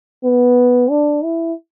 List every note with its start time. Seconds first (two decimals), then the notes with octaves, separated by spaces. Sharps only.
0.24 B3
0.90 D4
1.24 E4